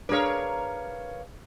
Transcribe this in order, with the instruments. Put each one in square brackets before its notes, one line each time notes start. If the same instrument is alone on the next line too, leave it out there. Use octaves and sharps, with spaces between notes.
[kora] D4 G#4 [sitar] A#4 C#5 [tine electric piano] B4 F5